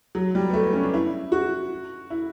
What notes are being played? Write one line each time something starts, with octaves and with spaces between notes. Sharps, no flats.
F#3
G3
B3
A3
B3
C#4
D4
E4
F#4
E4